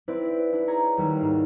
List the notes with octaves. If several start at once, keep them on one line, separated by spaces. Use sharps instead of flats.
C4 E4 B4 D5
D4 E4
G#4 C#5 A#5
D#2 G3 F#4
G#2 F5